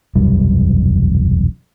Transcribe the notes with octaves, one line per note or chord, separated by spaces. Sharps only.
E1 C2 F#2 G3